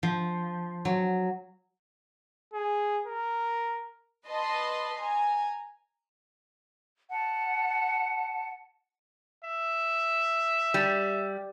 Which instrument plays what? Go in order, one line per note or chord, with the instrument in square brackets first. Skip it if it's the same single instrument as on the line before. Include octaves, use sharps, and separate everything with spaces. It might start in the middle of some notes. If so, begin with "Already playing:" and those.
[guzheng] F3
F#3
[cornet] G#4
A#4
[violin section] B4 D#5 A5 B5 C6
G#5 A#5
[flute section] F#5 A5
[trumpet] E5
[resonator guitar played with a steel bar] G3